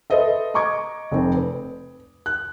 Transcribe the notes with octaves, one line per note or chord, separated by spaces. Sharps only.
A4 B4 C5 D#5 E5
D#5 A#5 C#6 D6 G#6
F1 C4
B4
F#6